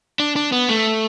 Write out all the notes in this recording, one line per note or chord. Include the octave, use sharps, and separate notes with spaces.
D4
D4
B3
A3